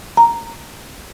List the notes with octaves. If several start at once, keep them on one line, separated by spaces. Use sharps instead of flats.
A#5